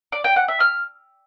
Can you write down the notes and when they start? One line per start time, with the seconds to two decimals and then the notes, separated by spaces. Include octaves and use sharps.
0.12 D5
0.24 G5
0.36 F#5
0.48 E5
0.60 F6